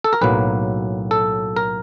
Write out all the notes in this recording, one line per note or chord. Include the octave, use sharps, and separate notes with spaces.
A4
A#4
B1 A2 F#3 A#3 B4
A4
A#4